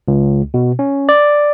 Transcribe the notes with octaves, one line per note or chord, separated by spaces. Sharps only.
C#2
B2
C#4
D5